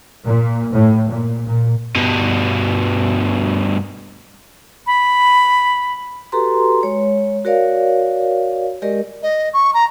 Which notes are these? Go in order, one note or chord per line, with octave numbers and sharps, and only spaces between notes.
A#2
A2
A#2
A#2
G2 B2
B5
F#4 G4 A4 B4 A#5 C6
G#3 C#5
F#4 A#4 C#5 D5 F5
G#3 G4 A#4 D5 D#5
D#5
C#6
A#5